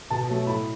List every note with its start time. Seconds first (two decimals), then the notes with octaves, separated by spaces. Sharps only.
0.10 B2 A5
0.29 F#3 A3
0.47 A2 B5